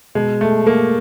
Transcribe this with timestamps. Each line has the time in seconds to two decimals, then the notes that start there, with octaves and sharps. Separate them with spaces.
0.15 B2 G#3
0.41 A3
0.67 A#3